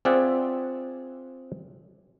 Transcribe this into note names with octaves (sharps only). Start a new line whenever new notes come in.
C4 F4 G#4 D5 E5 F#5